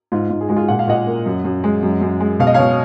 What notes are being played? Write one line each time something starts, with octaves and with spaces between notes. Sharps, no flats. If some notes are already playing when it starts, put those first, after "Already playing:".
G#2 F4
G#2
G#4
G#3 F#4
F4 G#4
A#2 F#5
F5
A#2 D#5 F#5
A#3
F#2
F#2
G#3
F#2
F#2
G#3
B2 F5
D#5
B2 C#5 F5